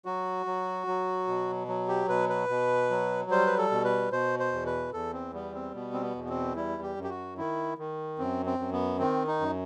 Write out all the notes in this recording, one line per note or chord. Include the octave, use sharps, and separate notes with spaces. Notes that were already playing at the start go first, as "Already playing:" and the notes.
F#3 F#4
F#3
F#3
B2
F#3
G4
B2 B4
B4
B2
F#3
G3 C5
B4
A4
B2
B4
B2 C5
C5
E2
B4
E2 A4
C4
G3 B3
C4
B2 B3
C4
B3
E2
B3
C4
G3 E4
G4
F#2
G4
F#4
D#3 E4
D#3
F#2 C4
C4
F#2
B3
D#3 C4
D#4
F#2